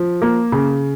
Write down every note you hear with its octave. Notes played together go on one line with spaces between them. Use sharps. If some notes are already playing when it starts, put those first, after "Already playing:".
Already playing: F3
A#3
C#3